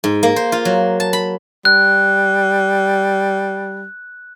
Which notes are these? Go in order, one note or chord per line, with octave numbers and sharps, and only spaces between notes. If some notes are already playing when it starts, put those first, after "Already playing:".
G#2
A#3
C5
F4
F#3
A5
B5
G3 F#6